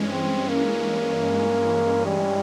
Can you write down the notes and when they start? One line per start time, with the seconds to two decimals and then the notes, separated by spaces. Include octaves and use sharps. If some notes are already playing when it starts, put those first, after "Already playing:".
Already playing: G2 E3 G#3 C#4
0.10 C4
0.49 A#3
2.06 G3